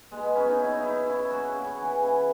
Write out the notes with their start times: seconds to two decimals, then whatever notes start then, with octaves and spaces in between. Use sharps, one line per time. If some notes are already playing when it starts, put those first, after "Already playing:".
0.11 B2 G#3
0.23 B3
0.35 F#3 C#4
0.47 D#4
0.59 C#3 E4
0.74 D#4
0.83 F#3 E4
1.06 C#3 E4
1.30 F#3 F#4
1.54 C#3
1.78 E3
2.02 C#3